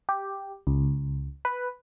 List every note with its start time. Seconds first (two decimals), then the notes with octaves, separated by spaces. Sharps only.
0.09 G4
0.67 C#2
1.45 B4